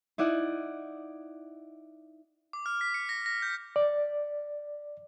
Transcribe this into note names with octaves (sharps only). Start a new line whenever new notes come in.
D#4 E4 D5 F#5
D6
F6
B6
C#7
A#6
A#6
G6
D5